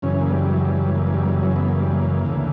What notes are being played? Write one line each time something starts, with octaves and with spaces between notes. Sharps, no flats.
F#2 C#3 E3 C#4
A#3
G3
F#3
G3
G3
A#3
A#3
G3
A#3
G3
F#3
B3
A#3
G3
A#3
D2 C#3 E3